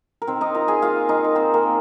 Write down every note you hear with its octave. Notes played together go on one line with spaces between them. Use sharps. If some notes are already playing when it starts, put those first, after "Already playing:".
A#4
D#3 C4 C5
D#4 D#5
F4 A#4 A#5
G#4 G#5
A#3 F4 F5
D#3 D#4 D#5
A#4
C4 F4 C5
A#3 A#4
D#3